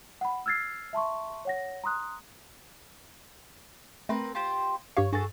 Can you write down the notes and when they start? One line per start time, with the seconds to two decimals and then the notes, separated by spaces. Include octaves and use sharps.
0.21 F#5 B5
0.46 E6 F6 G#6 A6 C7
0.93 E5 A5 C6 C#6
1.45 C#5 F#5 A#6
1.84 A#5 C6 D#6 F#6
4.09 A3 C4 A#4 B4
4.35 F4 G4 C5
4.97 G2 G4 C#5 F5
5.13 G2 F#4 G#4 A4 A6